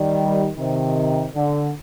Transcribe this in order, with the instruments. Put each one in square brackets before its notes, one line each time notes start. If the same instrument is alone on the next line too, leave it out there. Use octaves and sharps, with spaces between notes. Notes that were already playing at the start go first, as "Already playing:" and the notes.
Already playing: [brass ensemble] D#3 G3
C3 D#3
D3